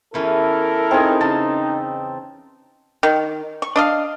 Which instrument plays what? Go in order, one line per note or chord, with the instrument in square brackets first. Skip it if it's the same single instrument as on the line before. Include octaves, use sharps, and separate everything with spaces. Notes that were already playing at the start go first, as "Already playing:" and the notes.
[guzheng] E2 E3 C#4 [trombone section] E4 A4 A#4
[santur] C4 G#4 [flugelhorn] D#4
[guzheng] C#3 [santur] A5
[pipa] D#3
C#6
D4 D#5 F5